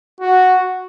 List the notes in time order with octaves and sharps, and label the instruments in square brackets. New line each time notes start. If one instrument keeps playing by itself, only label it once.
[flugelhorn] F#4